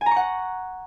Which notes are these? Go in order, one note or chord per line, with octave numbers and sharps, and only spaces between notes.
G#5
A#5
C#6
F#5